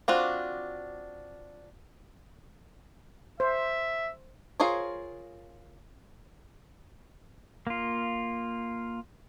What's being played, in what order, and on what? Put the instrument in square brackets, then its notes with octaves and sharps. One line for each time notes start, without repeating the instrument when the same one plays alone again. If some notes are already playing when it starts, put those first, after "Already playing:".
[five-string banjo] C4 D4 F4 F#4
[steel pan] C5 [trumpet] E5
[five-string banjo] F4 G#4 A#4 C5 C#5
[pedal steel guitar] A#3 F4